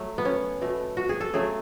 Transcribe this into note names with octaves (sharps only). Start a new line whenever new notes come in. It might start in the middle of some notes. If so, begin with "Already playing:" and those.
Already playing: F#3 A3
B3
C#4
B2 A3
F#4
G#4
A4
C#3 F#3 A3 G#4